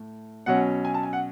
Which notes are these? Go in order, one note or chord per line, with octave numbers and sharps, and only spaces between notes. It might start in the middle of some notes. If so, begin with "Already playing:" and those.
Already playing: A2
B2 F#3 C#4 F#5
G#5
A5
G#5
F#5